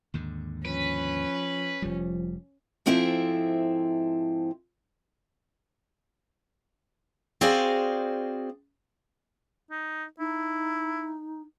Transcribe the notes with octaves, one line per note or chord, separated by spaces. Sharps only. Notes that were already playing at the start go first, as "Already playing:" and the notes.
D#2 G#2 D3
F3 C#4 B4
F1 F3 G3
G#2 F3 C4 E4 A4 E5
C4 F#4 G#4 C5 D5 F5
D#4
D#4 E4